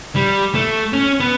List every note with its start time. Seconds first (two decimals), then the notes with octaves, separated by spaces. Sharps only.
0.16 G3
0.55 A3
0.93 C#4
1.20 B3